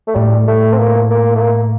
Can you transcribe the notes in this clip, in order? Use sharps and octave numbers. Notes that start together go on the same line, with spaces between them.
A3
A2 G3
A3
C4
A#3
A#3
A3
A#3